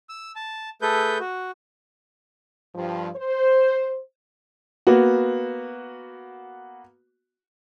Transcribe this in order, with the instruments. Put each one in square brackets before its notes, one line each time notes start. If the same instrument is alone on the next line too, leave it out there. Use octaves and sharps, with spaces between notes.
[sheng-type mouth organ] E6
A5
A3 G#4 A4 B4 G6
F#4
[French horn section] G2 F3
C5
[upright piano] A#3 B3 F#4